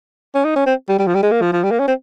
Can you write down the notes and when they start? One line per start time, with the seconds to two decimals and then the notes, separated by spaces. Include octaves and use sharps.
0.35 C#4
0.45 D#4
0.56 C#4
0.66 C4
0.89 G3
0.99 G3
1.07 F3
1.14 G3
1.23 G#3
1.31 A#3
1.41 F3
1.53 F3
1.63 G3
1.71 A#3
1.79 C#4
1.88 C4